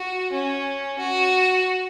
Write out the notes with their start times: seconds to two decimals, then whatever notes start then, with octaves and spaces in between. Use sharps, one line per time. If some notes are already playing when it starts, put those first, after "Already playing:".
Already playing: F#4
0.32 C#4
0.99 F#4